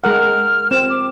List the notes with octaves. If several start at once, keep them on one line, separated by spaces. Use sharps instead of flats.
G#3 A#4 F#5 F6
C4 E7
D6